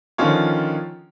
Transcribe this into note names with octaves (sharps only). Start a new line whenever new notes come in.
D3 D#3 F3 C#4 F4 C#5